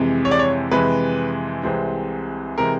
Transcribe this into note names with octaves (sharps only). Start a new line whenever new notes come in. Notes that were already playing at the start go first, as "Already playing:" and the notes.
Already playing: F2 C3 E3 G#3
C#5
D5
C#5
F2 C3 E3 G#3 B4
C2 C3 E3 G#3 C4
C3 E3 G#3 C4 A#4